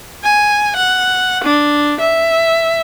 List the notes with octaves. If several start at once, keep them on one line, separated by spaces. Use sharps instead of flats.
G#5
F#5
D4
E5